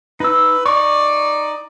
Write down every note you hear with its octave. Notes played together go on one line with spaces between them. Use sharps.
D#4 B4 E6
D#4 D5 C#6